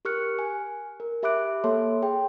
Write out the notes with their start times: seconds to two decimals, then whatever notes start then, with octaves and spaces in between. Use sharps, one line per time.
0.05 G4 A#4 C#6 F6 F#6 C#7
0.39 G#5
1.00 A#4
1.23 G4 E5 B5 D6 F#6 D7
1.64 A#3 A4 C#5 E5 A5 C6
2.02 G#4 G5